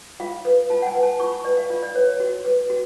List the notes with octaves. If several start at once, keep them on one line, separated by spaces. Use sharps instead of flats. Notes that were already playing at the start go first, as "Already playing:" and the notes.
F4 F5
B4
F4 A5
F#5
G#5
B4
A5
F4 C#6
B5
B4 D5
F5
F4 D5
D5
B4 C#5
F#4
B4
F#4